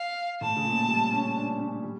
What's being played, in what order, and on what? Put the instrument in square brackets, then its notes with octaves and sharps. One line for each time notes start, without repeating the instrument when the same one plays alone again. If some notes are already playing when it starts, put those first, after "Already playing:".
Already playing: [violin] F5
[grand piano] A2 [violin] A5
[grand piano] C#3
A#2
G3
C#4
D4
C#4
G3